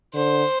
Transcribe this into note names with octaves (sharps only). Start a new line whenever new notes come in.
D3 C5